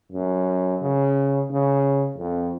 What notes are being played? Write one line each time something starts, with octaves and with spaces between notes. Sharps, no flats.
F#2
C#3
C#3
F2